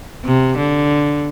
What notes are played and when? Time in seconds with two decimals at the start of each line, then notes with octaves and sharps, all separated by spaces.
0.25 C3
0.57 D3